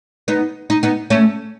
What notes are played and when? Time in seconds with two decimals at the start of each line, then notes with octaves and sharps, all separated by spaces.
0.28 B3 D#4
0.70 D#4
0.83 B3 D#4
1.10 A3 C#4